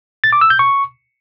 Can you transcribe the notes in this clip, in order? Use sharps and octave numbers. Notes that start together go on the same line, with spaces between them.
A6
D6
E6
G6
C#6